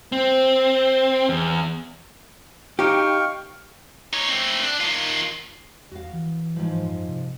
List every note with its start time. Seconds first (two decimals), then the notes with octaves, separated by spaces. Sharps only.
0.12 C4
1.29 E2
2.79 D#4 G4 F5 G5 C#6
4.13 D#4 C#5
4.28 A3 C4
4.63 D4
4.81 D#3 F4
5.91 E2 F#4 F5
6.13 E3
6.56 G#2 F3
6.85 F#2
7.08 C3